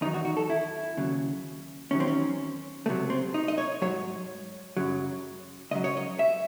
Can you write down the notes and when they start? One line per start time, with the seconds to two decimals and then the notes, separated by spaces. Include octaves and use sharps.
0.01 E2 D#3 F#3 D#4
0.14 F#4
0.25 F#4
0.37 A4
0.50 E4
0.97 D#2 C#3 F#3
1.91 E2 D#3 F#3 C#4
2.00 C4
2.08 C#4
2.86 C#2 C3 F#3 A3
3.10 C4
3.34 D#4
3.48 D#5
3.58 C#5
3.82 G#2 D#3 F#3 C#5
4.77 F#2 C#3 F#3
5.71 C#2 C#3 F#3 D#5
5.84 C#5
5.97 D#5
6.19 E5